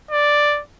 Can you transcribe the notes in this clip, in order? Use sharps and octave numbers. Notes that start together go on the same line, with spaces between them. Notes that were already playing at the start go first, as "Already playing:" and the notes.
D5